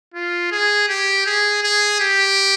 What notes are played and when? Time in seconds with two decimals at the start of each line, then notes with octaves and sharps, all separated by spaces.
0.14 F4
0.52 G#4
0.89 G4
1.26 G#4
1.63 G#4
2.00 G4